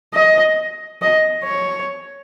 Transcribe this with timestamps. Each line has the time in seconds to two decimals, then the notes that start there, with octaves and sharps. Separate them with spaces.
0.14 D#5
1.02 D#5
1.44 C#5